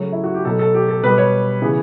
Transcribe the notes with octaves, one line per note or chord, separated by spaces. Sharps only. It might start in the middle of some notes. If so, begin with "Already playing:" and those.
Already playing: C#3 F#3 A3 C#5
E4
F#4
G4
B2 F#3 A3 A4
A4
G4
A4
B2 G3 B3 B4
C#5
C#3 E3 B3